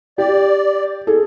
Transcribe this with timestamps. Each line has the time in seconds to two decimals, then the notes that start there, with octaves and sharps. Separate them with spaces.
0.18 G4 D5
1.07 G#4 A4